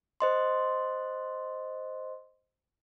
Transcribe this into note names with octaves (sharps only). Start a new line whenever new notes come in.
C5 D#5 C6